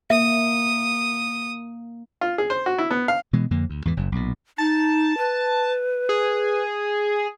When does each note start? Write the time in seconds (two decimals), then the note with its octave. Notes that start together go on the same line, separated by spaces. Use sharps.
0.10 A#3 E5 D#6
2.21 F4
2.38 G#4
2.50 C5
2.66 F#4
2.78 E4
2.90 B3
3.08 F5
3.33 B2 E3 G#3
3.51 F2 D3 A#3
3.70 D2
3.85 E2 G#2 E3
3.97 F#1 F#2
4.12 B1 A#2
4.58 D#4 A5
5.18 B4
6.09 G#4